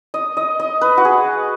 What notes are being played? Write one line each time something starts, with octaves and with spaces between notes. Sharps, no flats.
D#5
D#5
D#5
B4
F#4
G#4